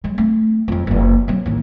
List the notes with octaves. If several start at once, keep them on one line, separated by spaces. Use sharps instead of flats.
F#3 G#3
A3 C4
F2 F#3
F#1 F3
F#3 C4
A1 D#2